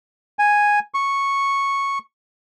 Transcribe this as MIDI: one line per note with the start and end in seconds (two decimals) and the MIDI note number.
0.39 0.79 80
0.94 1.98 85